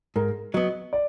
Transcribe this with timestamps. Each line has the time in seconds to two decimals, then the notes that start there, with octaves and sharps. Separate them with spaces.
0.16 G#2 A#4
0.54 F#3 B3 D#5
0.93 D5